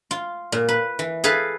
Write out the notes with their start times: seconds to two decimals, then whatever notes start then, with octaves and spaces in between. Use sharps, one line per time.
0.11 F4
0.52 A#2
0.69 B4
0.99 E3
1.24 G#4 A4 B4 F5 A5